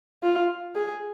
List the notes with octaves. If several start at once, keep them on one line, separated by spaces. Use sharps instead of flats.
F4
G#4